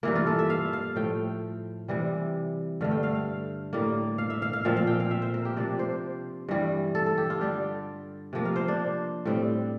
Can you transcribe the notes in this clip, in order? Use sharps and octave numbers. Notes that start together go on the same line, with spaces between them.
G2 E3 A#3 E4
F4
A4
E5
F5
F5
A2 F3 A3 G5
C3 E3 G3
G2 D3 A3 F5
G5
F5
F5
A2 G3 A#3
F5
E5
F5
F5
A#2 F3 C4 E5
F5
G5
F5
E5
C5
A#4
G4
C3 F3 A#3 D4 D5
C5
G2 E3 G3
A4
A4
G4
F4
D3 G3 D4 G4
C3 F3 A#3
F5
C5
D4
A2 G3 C4